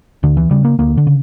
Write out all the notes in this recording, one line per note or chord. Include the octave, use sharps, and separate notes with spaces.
D2 D3
E3
C#3 G3
A#3
D2 A#3
D3
C#3